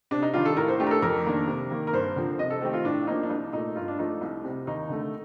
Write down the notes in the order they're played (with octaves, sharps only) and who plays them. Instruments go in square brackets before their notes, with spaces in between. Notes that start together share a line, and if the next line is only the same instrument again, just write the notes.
[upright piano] C3 D4
D#4
D#3 G3 D4 F4
A4
A2 A#4
C5
A3 D4 G4
A#4
A4
F2 A#4
D#3 A#3 D4
C3
D#3 A#3
A#4
G2 C5
D3 F3 C4
C3 D#5
A4
D#3 A3 C4 G4
F4
A2 D4
F3 A#3 D4 D#4
D4
C2 D#4
A#2 A3 D#4
G2 F4
D4
F3 A3 D4 D#4
C2
C3 G3
D#2 D#4
D3 A3